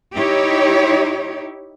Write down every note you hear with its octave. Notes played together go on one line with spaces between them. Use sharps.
D#4 E4 G4 C#5